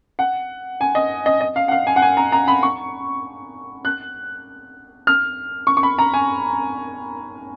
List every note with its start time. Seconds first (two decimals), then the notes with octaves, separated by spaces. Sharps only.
0.19 F#5
0.81 G#5
0.95 D#5
1.26 D#5
1.41 D#5
1.56 F5
1.68 F#5
1.71 F5
1.87 G#5
1.96 F#5
2.02 G#5
2.17 A#5
2.32 A#5
2.48 B5
2.63 C#6
3.85 F#6
5.07 F6
5.67 C#6
5.77 C#6
5.83 B5
5.98 A#5
6.14 G#5